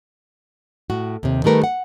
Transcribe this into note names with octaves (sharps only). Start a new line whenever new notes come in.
A2 F#4
D#2 C3
D#3 G3 A3 A#4 B4
F#5